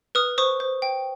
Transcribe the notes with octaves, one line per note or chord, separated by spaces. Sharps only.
B4 D#6 F6
C5 C#6 D#6
C5
G5